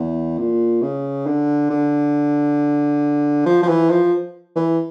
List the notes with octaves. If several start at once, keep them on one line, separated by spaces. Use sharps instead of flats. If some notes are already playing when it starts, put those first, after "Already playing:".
Already playing: E2
A#2
C#3
D3
D3
F3
F3
E3
F3
E3